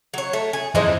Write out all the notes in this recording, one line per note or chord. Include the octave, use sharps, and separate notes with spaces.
F#3 C#5
A3
G#4
F2 D3 E3 G#3 D#4 E4 C5 D#5